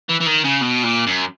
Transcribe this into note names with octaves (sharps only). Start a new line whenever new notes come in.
E3
E3
D#3
C#3
B2
A#2
F#2